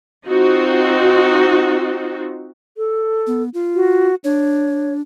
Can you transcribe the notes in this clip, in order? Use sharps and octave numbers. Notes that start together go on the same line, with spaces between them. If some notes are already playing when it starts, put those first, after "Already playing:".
C4 D#4 F4 F#4
A4
B3
F4
F#4
D4 C#5